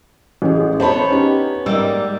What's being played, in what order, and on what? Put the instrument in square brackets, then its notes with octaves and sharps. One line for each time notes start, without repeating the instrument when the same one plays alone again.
[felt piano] A1 G#4
[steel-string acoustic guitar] B3 C#5 [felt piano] C5 A5 B5
[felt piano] C#4 D#4 G4
[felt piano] G#2 D#5 E6 [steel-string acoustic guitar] G3 A#3